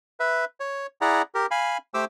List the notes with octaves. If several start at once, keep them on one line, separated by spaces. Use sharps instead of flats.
B4 E5
C#5
E4 G#4 D5 F#5 A#5
G4 A#4
F5 G#5 B5
A3 G4 C5 D6 E6